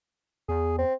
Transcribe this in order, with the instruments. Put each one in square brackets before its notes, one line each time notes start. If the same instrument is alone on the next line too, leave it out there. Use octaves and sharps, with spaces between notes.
[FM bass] E2 [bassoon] G#4
[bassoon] C4